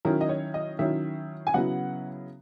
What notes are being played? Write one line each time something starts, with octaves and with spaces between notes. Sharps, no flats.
D#3 F#3 C#4 E4 A#4
D#5
C#5
D#5
D#3 F#3 C#4 E4 E5
G#5
C#3 F#3 B3 E4 F#5